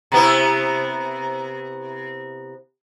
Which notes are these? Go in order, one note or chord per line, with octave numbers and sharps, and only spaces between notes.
C3 B3 E4